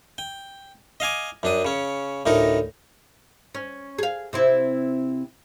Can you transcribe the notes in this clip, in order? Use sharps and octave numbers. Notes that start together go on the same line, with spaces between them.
G5
D#5 F5 G#5 D6
F#2 D4 D#6
C#3 C#4
D2 A2 D#4 A#4
C#4
G#4 F5
C3 C4 E4